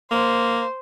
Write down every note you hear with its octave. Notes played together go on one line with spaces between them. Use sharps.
A#3 C5